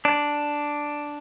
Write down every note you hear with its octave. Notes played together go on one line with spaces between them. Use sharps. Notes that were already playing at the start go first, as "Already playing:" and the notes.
D4